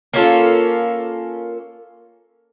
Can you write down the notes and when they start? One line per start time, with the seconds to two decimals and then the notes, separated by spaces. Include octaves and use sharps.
0.14 A#3 C#4 F4 A4